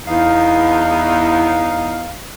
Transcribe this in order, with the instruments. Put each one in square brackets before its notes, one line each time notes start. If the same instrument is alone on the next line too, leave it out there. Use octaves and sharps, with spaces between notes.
[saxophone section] E2 [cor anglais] D#4 [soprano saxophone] F5